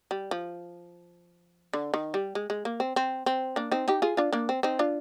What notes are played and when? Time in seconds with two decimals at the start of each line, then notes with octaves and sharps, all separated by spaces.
0.11 G3
0.31 F3
1.73 D3
1.94 D#3
2.14 G3
2.35 G#3
2.50 G#3
2.65 A#3
2.80 C4
2.96 C4
3.26 C4
3.56 A#3 D4
3.72 C4 D#4
3.88 D#4 G4
4.02 F4 G#4
4.17 D4 F4
4.33 A#3 D4
4.49 C4
4.63 C4 D#4
4.79 D4 F4